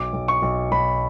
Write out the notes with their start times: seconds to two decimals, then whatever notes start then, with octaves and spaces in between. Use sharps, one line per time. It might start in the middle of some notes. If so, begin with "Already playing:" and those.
Already playing: B1 D6
0.13 B1
0.28 C#6
0.42 B1
0.72 B1 B5